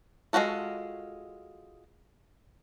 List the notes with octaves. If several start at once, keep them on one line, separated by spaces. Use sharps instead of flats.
G#3 C#4 F4 F#4 A4